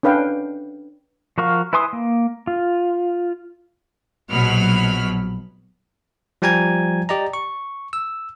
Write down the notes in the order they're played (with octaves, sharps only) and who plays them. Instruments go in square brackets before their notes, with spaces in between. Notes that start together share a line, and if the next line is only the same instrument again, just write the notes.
[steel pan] C#4 D4 B4 F5 G5
[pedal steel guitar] F3 F#4 A#4 F5 C#6
E4 B4 G#5 C6 D#6
A#3
F4
[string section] A#1 B2 F#3 B5 F6
[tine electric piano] F3 G3 G5 G#5 A#5 G#6
G4 D5 D#5 A#5
C#6
E6